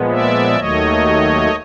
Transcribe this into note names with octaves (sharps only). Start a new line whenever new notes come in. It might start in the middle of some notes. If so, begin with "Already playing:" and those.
Already playing: A#2 F3 G#3 B3
D5 E5
D#2 D#3 F#3 A3 C#5 D#5